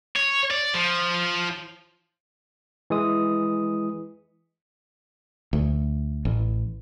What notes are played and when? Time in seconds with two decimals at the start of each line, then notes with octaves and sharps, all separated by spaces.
0.16 C#5
0.51 D5
0.74 F3
2.90 E3 G#3 D#6
5.53 D2
6.25 A1